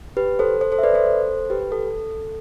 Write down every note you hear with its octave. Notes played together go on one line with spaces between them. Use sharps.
G4 B4
A4 C5
A4 C5
A4 C5
E5
B4 D5
A4 C5
G4 B4
A4